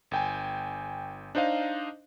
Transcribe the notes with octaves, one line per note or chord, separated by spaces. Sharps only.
G1 G5 G#5
D4 D#4 C5 D#5 F5